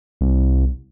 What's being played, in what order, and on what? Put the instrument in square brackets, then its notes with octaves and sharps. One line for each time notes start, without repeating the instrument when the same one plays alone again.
[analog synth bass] C2